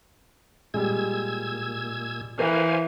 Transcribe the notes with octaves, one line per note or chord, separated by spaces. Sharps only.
A#2 G3 G#3 E6 G#6
E3 A#4 C5 F5 G#5